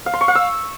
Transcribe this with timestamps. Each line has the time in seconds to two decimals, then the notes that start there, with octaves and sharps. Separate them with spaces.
0.06 F5
0.13 C6
0.21 C#6
0.28 F5
0.35 E6